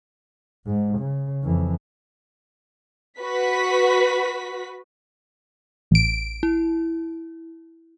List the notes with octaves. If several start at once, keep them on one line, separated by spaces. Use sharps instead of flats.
G#2
C#3
F2 E3
F#4 B4 B6
A1 D7
E4